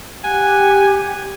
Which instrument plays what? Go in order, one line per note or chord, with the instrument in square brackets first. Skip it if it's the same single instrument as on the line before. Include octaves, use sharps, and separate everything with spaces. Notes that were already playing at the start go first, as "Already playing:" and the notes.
[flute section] G4 [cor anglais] F#5 [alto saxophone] G#5